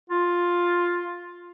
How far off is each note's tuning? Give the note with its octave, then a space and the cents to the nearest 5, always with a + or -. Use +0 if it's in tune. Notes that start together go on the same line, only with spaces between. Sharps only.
F4 +5